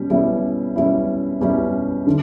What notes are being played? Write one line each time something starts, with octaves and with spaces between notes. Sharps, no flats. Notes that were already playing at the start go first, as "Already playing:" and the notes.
Already playing: B2 G3 C#4
B2 G3 C#4 E4
B2 G3 C#4 E4
B2 G3 C#4 E4
D3